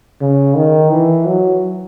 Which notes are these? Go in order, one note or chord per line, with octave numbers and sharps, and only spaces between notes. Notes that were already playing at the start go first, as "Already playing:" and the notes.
C#3
D#3
E3
F#3